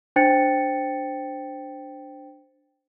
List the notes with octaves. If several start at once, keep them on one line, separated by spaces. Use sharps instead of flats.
D4 C5 G5 A6 C#7